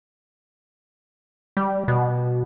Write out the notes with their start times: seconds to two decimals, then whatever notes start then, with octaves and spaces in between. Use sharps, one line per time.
1.57 G3
1.88 B2